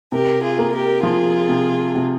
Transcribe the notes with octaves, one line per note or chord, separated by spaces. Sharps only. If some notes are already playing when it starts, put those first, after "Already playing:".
C3 G4 A#4
F4 G#4
A#3
G4 A#4
F3 F4 G#4
C3
C3